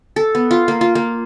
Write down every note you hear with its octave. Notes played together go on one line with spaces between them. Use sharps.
A4
B3
F4
A#3
F4
A#3